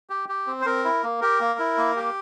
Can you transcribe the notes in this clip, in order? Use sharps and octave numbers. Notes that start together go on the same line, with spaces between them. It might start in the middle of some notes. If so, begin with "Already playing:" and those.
G4
G4
C4
C5
C4 A#4
E4
A#3
G4 A#4
A#3
E4
A#3
G4